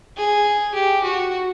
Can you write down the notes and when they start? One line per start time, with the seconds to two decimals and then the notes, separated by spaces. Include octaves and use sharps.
0.17 G#4
0.74 G4
1.04 F#4